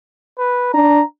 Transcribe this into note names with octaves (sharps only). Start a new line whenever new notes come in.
B4
D4 A#5